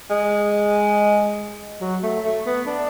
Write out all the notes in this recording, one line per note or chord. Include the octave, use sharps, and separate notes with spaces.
G#3
F#3
A3
A3
B3
D4